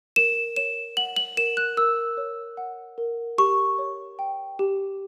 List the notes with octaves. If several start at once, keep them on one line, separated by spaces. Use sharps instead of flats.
A#4 E7
C#5 E7
F#5 F#7
F#7
A#4 E7
F#6
A#4 E6
C#5
F#5
A#4
G4 C#6
C#5
G5
G4